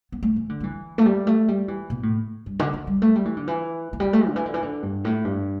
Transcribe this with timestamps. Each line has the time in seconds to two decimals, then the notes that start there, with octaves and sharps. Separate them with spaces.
0.12 B3
0.23 A3
0.36 E3
0.49 D3
0.60 G3
0.64 E3
0.98 A3
1.06 G3
1.27 A3
1.48 G3
1.68 E3
1.90 B2
2.03 A2
2.46 G2
2.59 D3
2.74 E3
2.87 G3
3.02 A3
3.15 G3
3.25 E3
3.37 D3
3.47 E3
3.93 E3
4.00 G3
4.13 A3
4.27 D3
4.36 E3
4.46 D3
4.54 E3
4.62 D3
4.83 G2
5.05 A2
5.25 G2